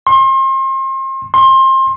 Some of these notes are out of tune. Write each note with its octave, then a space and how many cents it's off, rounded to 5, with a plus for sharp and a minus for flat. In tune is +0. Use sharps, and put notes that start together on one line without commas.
C6 +35
C6 +25